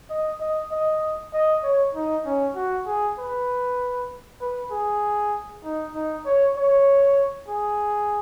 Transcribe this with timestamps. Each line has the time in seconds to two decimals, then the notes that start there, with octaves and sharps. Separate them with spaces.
0.10 D#5
0.41 D#5
0.71 D#5
1.34 D#5
1.63 C#5
1.95 D#4
2.26 C#4
2.56 F#4
2.87 G#4
3.19 B4
4.41 B4
4.71 G#4
5.64 D#4
5.95 D#4
6.26 C#5
6.57 C#5
7.48 G#4